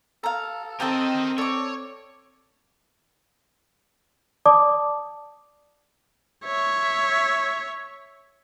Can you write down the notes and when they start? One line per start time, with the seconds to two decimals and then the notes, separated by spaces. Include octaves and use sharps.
0.24 A4 F5 A#5
0.80 C4 G4 A#4 D#5 G5 A5
1.38 A4 C#5 D5 D6
4.46 D5 A5 D6 D#6
6.45 C#5 E5